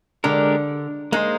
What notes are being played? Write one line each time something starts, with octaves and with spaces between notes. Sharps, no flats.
D3 G#3 D4 G4 A#4
G#3 A#3 D#4 G#4 C5